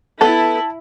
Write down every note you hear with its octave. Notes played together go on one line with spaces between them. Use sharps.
B3 E4 A4 A5